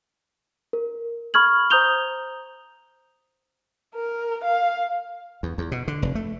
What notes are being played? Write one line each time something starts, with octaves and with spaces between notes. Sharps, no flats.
A#4
B5 C#6 F6 G#6 F#7
C5 A#5 D#6 G6 F7 G7
A#4
F5
E2
E2
B2
D3
F1
A3